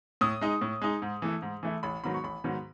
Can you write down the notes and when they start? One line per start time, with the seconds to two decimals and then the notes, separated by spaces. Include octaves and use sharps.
0.21 A2 D#6
0.41 G#3 D#4
0.61 A2
0.81 G#3 D#4
1.02 G#2
1.22 E3 A3 E4
1.42 G#2
1.63 E3 A3 E4
1.83 A1 B5
2.04 G#2 D#3 F#3 B3 B5
2.14 C#6
2.24 A1 B5
2.44 G#2 D#3 F#3 B3